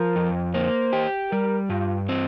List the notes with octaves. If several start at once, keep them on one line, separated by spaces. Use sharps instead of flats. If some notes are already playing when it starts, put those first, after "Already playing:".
Already playing: F3 A#4
F2
A#3 C5
G4
G3 A#4
G2 F4
C4